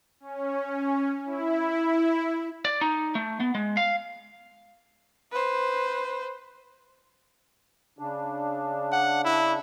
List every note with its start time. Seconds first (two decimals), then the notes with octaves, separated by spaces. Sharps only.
0.20 C#4
1.25 E4
2.65 D5
2.81 D#4
3.15 A3
3.40 B3
3.55 G#3
3.77 F5
5.32 B4 C5
7.99 C#3 D4
8.92 F#5
9.25 E4